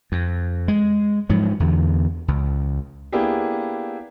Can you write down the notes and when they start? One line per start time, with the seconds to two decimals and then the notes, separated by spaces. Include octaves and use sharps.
0.12 F2
0.68 G#3
1.29 G#2 F3 F#3
1.60 E2 D3
2.28 C#2
3.12 A#3 B3 D4 E4 G4 G#4